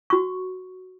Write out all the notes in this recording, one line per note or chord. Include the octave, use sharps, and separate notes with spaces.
F#4 C#6